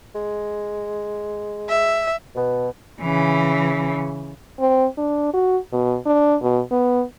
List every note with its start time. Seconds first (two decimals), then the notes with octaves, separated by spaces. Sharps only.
0.15 G#3
1.70 E5
2.35 B2
3.01 C#3 E3
4.60 C4
4.98 D4
5.33 F#4
5.73 B2
6.06 D4
6.41 B2
6.71 B3